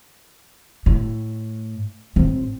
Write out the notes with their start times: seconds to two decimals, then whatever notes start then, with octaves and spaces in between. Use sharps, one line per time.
0.86 A2
2.16 A1 C4